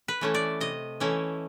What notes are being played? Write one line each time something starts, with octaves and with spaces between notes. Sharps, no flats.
B4
E3 A3 C#4 E4
D5
C3 D#5
E3 A3 C#4 E4